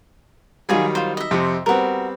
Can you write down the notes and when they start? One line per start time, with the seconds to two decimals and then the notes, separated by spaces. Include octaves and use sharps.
0.69 D#3 F#3 G3 F4 G#4 G#5
0.95 F4 C5
1.17 D#5 E5
1.31 F2 C3
1.66 G3 B3 C4 F#4 A#4